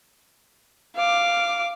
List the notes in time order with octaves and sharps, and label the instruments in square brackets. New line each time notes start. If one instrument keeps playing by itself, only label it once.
[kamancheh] F5 D6